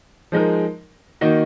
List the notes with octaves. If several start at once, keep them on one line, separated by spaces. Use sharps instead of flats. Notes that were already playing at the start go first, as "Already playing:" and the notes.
F3 G#3 D#4 A#4
D#3 A#3 D#4 F#4